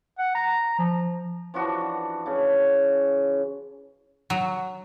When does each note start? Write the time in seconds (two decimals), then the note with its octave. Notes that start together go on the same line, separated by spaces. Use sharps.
0.19 F#5
0.35 A#5
0.78 F3
1.54 E3 F3 D4 F#4
2.26 C#3
4.30 F#3